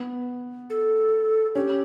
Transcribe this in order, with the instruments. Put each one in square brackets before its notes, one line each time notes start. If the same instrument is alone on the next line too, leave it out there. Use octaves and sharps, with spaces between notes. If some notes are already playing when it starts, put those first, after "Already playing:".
Already playing: [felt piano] B3
[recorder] A4
[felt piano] C#4 [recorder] G4